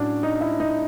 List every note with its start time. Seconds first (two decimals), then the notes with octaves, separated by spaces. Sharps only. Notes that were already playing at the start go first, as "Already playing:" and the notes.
Already playing: A2 F#3 C#4 D4
0.23 D#4
0.41 E4
0.60 D#4